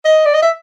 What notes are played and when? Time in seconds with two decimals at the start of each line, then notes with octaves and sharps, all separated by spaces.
0.05 D#5
0.26 D5
0.34 D#5
0.42 E5